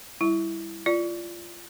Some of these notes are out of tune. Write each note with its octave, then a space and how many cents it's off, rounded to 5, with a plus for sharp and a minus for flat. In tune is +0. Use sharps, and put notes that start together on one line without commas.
G3 +0 E4 +0
F4 -20 D5 +0